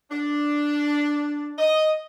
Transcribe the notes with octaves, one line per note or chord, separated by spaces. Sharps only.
D4
D#5